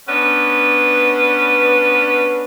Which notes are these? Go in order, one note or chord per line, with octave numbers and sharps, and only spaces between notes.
B3 C#4 D4 B4